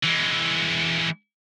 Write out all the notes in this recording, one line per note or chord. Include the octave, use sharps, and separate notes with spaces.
E3 G#3